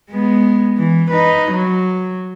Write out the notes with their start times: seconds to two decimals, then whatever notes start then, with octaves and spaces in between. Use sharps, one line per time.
0.11 G#3 B3
0.78 E3
1.10 D#4 B4
1.51 F#3